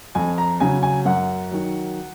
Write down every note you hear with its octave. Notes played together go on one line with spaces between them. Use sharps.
F2 G#5
A#5
C#3 F#3 G#5
G#5
F#2 F#5
D#3 F#3